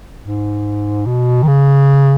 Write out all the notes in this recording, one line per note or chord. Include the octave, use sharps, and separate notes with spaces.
G#2
B2
D#3
C#3